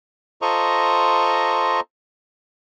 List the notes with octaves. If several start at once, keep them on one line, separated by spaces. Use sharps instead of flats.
F4 A4 C5 D#5 A#5 C#6